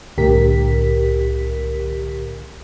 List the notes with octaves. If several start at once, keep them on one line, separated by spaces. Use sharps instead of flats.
C2 A2 D3 G4 A#4 B6